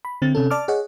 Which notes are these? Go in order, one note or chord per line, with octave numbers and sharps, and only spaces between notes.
B5
D3 C4 A6
C3 C#4 A4
D5 A5 D6 F6
G#4 C#5 D#5 F#5